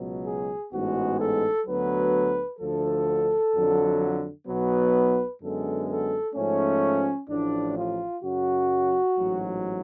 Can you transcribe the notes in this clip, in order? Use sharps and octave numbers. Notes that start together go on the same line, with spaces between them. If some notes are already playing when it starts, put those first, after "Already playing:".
Already playing: C#2 B2 F#3
G#4
A1 G#2 G#3 B3 F#4
A4
D2 D3 F#3 B3 B4
D2 D3 F3 A4
F2 D3 F#3
B1 B2 F#3 B3 B4
F#2 D3 G#3 B3 A4
A4
G#2 F3 A3 C#4
A1 A2 F3 D4
F4
F#2 C#3 F#3 F#4
A1 G#2 F#3